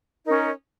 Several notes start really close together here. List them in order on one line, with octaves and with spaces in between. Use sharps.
D#4 A#4 C#4